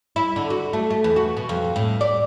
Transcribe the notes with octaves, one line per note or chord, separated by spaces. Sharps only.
E4
D3
F#4
A3
A3
E2
F#4
B2
F2
A2
D5